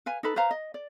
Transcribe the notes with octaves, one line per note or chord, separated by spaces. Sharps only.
B4 F5 G#5
D#4 A4 B4 B5
B4 C5 F5 A#5
D#5
D5